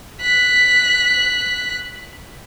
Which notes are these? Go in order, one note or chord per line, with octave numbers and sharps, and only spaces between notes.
F#6 B6